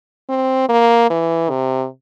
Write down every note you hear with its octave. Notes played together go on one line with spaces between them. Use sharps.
C4
A#3
E3
C3